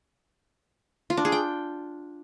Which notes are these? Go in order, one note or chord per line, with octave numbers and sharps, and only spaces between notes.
F4
D4
G#4
G5